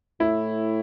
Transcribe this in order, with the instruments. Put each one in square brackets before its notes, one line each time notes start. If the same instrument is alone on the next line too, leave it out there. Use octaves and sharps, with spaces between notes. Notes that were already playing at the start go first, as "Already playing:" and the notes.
[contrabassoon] A2 [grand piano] E4